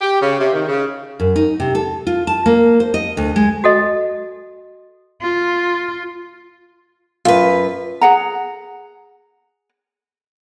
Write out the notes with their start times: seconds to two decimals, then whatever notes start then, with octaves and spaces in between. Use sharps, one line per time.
0.01 G4
0.22 C#3
0.39 C3
0.53 D#3
0.68 C#3
1.20 F#2
1.36 D#4
1.60 C3
1.75 A4
2.07 F4
2.27 A5
2.46 A#3
2.80 C5
2.94 D#5
3.17 D2
3.36 G#3
3.64 F#4 A4 D#5
5.22 F4
7.25 F#2 F4 B4
8.01 G#4 F#5 A#5